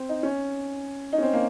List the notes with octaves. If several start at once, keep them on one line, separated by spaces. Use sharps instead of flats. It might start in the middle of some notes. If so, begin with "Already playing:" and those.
Already playing: C4
D#4
C#4
D#4
C#4
C4
A#3